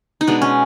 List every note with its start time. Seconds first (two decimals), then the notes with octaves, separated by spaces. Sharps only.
0.21 D#4
0.27 B2 G#3 B3 D4
0.42 C#4